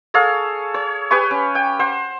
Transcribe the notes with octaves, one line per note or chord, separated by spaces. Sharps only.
G#4 A4 C#5 F5
C#5
G4 B4 G#5 C#6
C#4
G5
C5 F#5